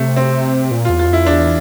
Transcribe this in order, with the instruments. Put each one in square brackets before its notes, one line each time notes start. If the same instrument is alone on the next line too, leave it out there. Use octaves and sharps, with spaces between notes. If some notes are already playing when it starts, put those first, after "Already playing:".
Already playing: [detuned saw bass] C3 [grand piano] A3
[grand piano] C4
[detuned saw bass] A#2
[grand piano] F4
[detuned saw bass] E2
[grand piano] F4
[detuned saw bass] F2 [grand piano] E4
[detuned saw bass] E2 [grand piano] D4